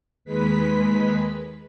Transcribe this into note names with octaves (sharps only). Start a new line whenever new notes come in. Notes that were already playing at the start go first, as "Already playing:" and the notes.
D#2 G#3 B4 B6